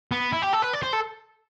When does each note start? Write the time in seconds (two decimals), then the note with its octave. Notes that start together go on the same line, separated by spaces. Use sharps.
0.11 B3
0.33 E4
0.42 G4
0.53 A4
0.62 B4
0.73 D5
0.83 C5
0.93 A4